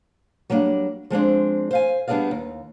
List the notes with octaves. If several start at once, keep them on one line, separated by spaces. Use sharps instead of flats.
F#3 G3 A#3 D4
F3 G#3 C4 D4
C5 F5 G#5
G3 B3 D4 G#4 D5 F5
D#2